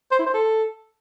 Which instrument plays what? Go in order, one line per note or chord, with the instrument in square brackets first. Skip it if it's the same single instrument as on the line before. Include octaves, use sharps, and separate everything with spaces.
[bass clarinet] C5
E4
C5
A4